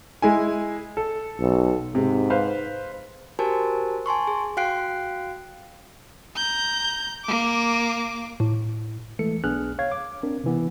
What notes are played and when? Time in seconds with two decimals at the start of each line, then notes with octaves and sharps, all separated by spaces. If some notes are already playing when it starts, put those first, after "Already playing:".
0.22 G#3 E4 G#5
0.97 A4
1.40 B1
1.95 G#2 C3
2.30 B4 C5 F5
3.39 F#4 G4 A#4 C5 G#5 A5
4.06 G#5 A5 C6 C#6
4.27 G#4
4.57 F#4 F5 G5 F#6 C7 D7
6.36 A#5 G6
7.24 A#3 D6
8.40 A2
9.19 E3 G#3 A3 A4 C#7
9.44 B1 B3 D4 G#4 F6 F#6
9.79 C#5 F5 G#6
9.92 D6
10.23 C4 D4 A#4
10.44 C3 E3 B3